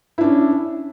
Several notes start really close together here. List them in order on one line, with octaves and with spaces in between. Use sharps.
E4 D4 C#4